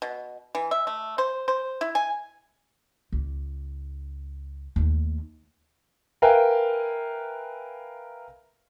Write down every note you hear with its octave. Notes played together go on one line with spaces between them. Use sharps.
B2
E3
E5
A3
C5
C5
E4
G#5
C#2
D#2 A3
A#4 B4 E5 F5 G5 G#5